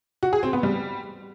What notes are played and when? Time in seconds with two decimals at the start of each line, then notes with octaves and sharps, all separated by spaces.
0.23 F#4
0.33 G#4
0.43 C4
0.53 B3
0.63 G3